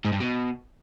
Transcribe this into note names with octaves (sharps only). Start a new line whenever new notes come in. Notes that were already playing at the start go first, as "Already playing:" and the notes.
G#2
G2
B2